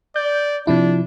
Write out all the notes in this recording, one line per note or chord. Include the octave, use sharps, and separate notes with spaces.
D5 G6
C3 F3 D4 E4